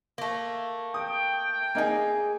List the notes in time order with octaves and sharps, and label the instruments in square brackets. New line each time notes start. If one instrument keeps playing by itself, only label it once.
[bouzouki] A3 A#3
[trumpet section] G5 [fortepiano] D#6
[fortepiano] A#3 D#4 [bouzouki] G#4 G#5